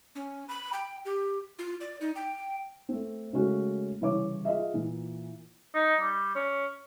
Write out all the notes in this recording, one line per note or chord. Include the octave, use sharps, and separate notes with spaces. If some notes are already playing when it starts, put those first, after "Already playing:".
C#4
B5
G5
G4
F4
D5
D#4
G5
A3 C4
C#3 G#3 A3 C#4 F#4
C2 C#3 E3 C#5 D6
F4 G#4 D#5 E5
A#2 E3
D#4
G3
C#4